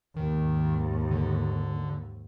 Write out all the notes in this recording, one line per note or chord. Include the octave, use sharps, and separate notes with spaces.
D#2 G#2 D#3
D3